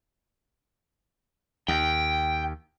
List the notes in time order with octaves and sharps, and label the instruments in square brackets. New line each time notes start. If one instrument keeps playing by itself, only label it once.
[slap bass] D#2 [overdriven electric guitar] G5